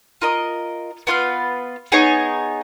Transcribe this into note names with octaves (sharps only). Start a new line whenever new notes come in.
F4 A#4 D#5
B3 F4 B4 F5
B3 D#4 G#4 C#5